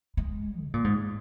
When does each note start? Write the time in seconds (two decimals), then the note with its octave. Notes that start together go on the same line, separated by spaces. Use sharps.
0.17 G#3
0.62 C3
0.74 A#2
0.84 G#2